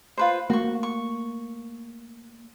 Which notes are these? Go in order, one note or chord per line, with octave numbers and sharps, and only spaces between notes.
F4 B4 C5
A3 A#3 F#4 C#6
C#6